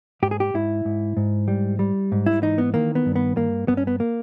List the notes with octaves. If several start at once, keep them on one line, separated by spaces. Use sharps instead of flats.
G#2 G4
G#4
G4
G#2 E4
G#2
G#2
G3
G3
G#2
E4
E3 D#4
B3
D#3 A#3
B3
G2
B3
G2 A#3
G2 B3
C#4
B3
A#3